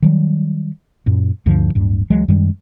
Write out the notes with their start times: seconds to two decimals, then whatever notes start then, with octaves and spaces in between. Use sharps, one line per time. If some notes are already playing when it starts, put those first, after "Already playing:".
0.02 D#3 F#3 G3
1.06 F#2 A#2
1.46 D2 G2 D3 F3
1.75 D1 G2
2.10 C#2 E3 F#3 G#3
2.28 F#2 D#3 G3 G#3